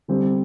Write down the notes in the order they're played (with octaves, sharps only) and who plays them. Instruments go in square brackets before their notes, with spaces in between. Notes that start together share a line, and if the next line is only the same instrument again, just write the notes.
[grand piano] D3 G3 C4 G4